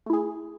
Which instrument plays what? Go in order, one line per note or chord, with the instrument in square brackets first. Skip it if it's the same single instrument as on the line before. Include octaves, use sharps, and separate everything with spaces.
[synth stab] A3
E4
G#4